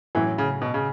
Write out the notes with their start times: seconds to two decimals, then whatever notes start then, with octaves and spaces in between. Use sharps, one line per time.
0.15 A2 E3 F#3 C#4 E4
0.38 C#3
0.62 B2
0.74 C#3